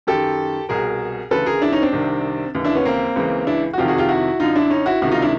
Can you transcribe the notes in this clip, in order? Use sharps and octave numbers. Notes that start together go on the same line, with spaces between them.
F#2 D#3 G4 A4
C2 B2 G#4 A#4
D2 C#3 E3 A4 B4
G#4 A#4
D4 E4
C#4 D#4
C4 D4
C2 C3 D#3
D#2 C#3 E3
D4 E4
B3 C#4
A#3 C4
C#2 C#3 E3
D4 E4
F#4
F2 C3 D#3 F4 G4
F#4 G#4
F4 G4
E4 F#4
F#2 D3 D#4 F4
D4 E4
C#4 D#4
E4 F#4
C#2 C3 D#3 E4 F#4
D#4 F4
D4 E4